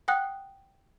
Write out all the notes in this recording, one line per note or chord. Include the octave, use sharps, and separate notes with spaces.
F#5 G5 D#6 F#6